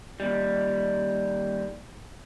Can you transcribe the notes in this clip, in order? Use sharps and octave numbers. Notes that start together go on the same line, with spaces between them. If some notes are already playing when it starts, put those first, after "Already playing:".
D#2 G3